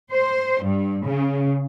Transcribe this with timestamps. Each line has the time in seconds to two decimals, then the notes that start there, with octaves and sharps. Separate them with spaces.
0.12 C5
0.62 G2
1.05 C#3